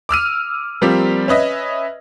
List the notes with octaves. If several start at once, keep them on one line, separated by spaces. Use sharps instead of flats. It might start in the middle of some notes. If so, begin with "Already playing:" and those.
D6 E6 F6 D#7
F3 G3 A#3 C4 G4
C#4 B4 D#5 E5